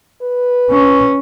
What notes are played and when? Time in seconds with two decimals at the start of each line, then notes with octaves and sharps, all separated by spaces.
0.22 B4
0.70 C#4